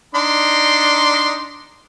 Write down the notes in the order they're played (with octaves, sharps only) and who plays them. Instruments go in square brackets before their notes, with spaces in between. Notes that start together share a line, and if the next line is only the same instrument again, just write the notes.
[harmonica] D4 D#4 C6